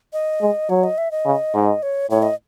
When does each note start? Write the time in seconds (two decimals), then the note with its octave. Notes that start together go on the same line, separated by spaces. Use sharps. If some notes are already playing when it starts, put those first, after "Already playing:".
0.13 D#5
0.41 G#3
0.70 F#3 C#5
0.83 D#5
0.98 E5
1.11 D#5
1.26 C#3
1.54 G#2
1.83 C#5
2.10 A2 C#5
2.23 D#5